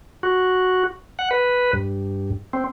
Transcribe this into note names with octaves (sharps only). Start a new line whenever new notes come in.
F#4
F#5
B4
G2
C4